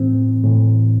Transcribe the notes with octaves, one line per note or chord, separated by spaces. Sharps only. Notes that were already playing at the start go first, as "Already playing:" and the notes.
Already playing: A2 E3 C4
A2 E3